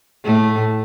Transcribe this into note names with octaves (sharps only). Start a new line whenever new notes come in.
A2 A3